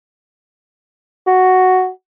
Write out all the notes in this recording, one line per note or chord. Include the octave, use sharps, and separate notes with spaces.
F#4